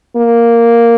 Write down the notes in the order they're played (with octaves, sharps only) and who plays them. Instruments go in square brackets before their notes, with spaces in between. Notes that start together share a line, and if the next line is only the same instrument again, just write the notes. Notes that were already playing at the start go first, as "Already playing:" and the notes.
[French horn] A#3